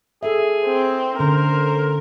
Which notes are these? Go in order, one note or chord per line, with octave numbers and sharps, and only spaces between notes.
G#4 A4 E5
C4
D3 C#4 A#4 C5